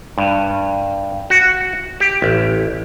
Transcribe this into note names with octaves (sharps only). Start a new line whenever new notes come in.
G2
F#4
G4
A1